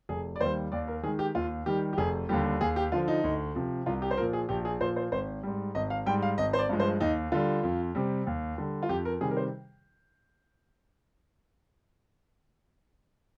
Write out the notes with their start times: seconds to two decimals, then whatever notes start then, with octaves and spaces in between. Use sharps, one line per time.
0.09 F1 G#4
0.36 D5
0.41 D#2 D#3 G3 C5
0.72 D#2 D5
0.88 A#4
1.03 D#3 G#4
1.08 G#3
1.19 G4
1.35 D#2 F4
1.66 D#3 G3 G4
1.93 G4
1.98 F1 G#4
2.29 D#2 D3 G3 G4
2.61 D#2 G#4
2.76 G4
2.92 D3 F3 F4
3.08 D#4
3.24 D2
3.55 C3 F3
3.86 C2 F4
4.02 G4
4.11 C5
4.18 A#2 F3 A#4
4.33 G#4
4.49 A#1 G4
4.65 G#4
4.81 A#2 F3 C5
4.96 C5
5.12 G#1 C5
5.43 G#2 G3
5.75 G#1 D#5
5.90 F5
6.06 G#2 G3 G5
6.22 F5
6.38 G#1 D#5
6.53 C5
6.59 D5
6.69 G2 F3 G#3
6.80 C5
7.00 D#2 D#4
7.32 D3 G3 F4
7.63 F2
7.95 C3 G3
8.27 D#2
8.58 D3 G3
8.83 F4
8.89 F2 G4
9.05 A#4
9.21 C3 D#3 G3 G#4
9.31 A#4
9.37 C5